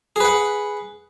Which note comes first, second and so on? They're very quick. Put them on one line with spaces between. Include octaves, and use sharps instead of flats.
G#4 B4 F#5